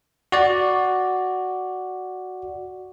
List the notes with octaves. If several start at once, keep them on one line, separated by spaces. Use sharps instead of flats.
F#4 D5